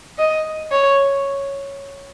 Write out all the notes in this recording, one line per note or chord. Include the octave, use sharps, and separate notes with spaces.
D#5
C#5